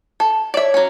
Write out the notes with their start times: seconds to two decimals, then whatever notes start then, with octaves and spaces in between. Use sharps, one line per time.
0.20 A4
0.54 C#5 D5 E5
0.74 F#3 C#4